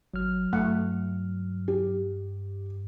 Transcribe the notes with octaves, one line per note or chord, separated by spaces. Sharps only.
G#1 F#3 F6
G2 A3 F#5
G4